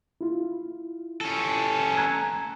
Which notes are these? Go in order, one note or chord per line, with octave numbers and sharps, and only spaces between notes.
E4 F4
C#4 A4
A#5 F#6 G#6